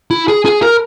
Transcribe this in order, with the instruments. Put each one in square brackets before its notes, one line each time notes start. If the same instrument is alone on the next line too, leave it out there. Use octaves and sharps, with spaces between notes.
[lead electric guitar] E4
G#4
G#4
A#4